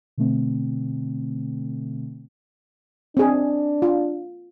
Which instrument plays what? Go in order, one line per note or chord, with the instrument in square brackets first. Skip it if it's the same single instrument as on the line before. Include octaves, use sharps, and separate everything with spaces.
[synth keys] B2 D3 A3 C4
[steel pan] C4 G#4 [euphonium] D4
[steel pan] F4